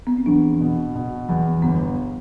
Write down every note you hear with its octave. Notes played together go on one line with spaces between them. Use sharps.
B3
C4
E2 D4
B2
B2
E2
G1 B3